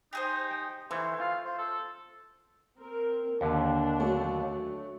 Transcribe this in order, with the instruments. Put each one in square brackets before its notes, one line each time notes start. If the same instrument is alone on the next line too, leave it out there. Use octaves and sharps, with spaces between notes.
[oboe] D#4 [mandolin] G4 G#4 C5
[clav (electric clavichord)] G5
[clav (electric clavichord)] E3 [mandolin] A3 [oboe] C5
[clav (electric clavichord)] F4 [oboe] F5
[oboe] C5
A4
[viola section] C4 A#4
[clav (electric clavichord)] D#2 D3 [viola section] D4
[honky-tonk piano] F#3 A3 C#4